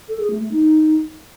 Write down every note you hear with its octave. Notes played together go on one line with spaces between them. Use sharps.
A4
G#4
A3
A3
D#4